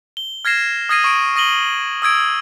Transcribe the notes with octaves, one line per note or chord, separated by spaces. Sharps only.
G7
F6 G#6 A#6 C7 E7
D#6 F6 G#6 A#6 C7 D#7
C#6 D7
D#6 A#6 D#7 F#7 G7
D#6 E6 G#6 D7